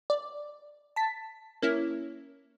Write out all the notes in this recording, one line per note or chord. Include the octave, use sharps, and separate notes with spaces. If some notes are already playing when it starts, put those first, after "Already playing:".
D5
A5 B6
A#3 C#4 E4